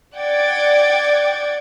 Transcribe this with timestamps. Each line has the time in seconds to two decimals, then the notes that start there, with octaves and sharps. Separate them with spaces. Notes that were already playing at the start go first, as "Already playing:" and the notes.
0.15 D5 F#5 G5 D6 G#6 A6